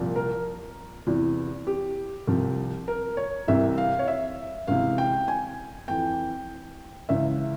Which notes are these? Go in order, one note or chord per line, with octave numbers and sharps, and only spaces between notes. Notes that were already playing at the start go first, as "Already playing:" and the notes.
Already playing: C2 A#2 F3
A#4
E2 C3 E3
G4
C2 C3 F3
A#4
C#5
C2 C3 E3 E5
F5
C#5
E5
C#2 C3 E3 F5
G5
G#5
F2 E3 G5
C#2 C#3 E3 E5